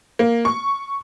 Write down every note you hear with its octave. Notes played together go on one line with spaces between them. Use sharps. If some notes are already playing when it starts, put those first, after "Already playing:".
A#3
C#6